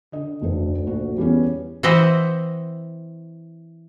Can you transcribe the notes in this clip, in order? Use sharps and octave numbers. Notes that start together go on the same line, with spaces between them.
D3 D#5
F1 D2 D3 A4
A#1 F#4
E2 G3 B3 C#4
E3 C4 C5 D#5 E5 F#5